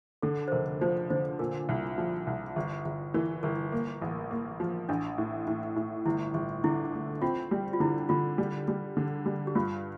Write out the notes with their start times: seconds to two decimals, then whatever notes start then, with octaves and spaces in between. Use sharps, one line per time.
0.22 D3 A4
0.48 C5
0.52 F1 A#4
0.81 F3 C5
1.10 D3 C5
1.39 A#2 A#4
1.69 C2
1.98 F3
2.27 C2
2.56 G1
2.85 G1
3.14 E3 A#4
3.43 G1 A#4
3.72 A#3
4.01 A1
4.31 A#3
4.60 F3
4.89 A1 D4
5.18 A2
5.47 A2
5.76 A2
6.06 G1 E4
6.34 G1
6.64 D3 E4
6.93 A3
7.22 C4 F4
7.51 G3
7.73 F4
7.80 D3 E4
8.09 D3 F4
8.38 G3
8.68 G3
8.97 D3
9.26 G3
9.47 G4
9.55 G2 F4